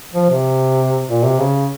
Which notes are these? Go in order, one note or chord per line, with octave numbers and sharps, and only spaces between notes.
F3
C3
A#2
C3
C#3